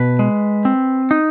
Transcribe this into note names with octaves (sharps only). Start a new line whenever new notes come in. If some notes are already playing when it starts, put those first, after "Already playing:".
Already playing: B2 B4
G#3
C4
D#4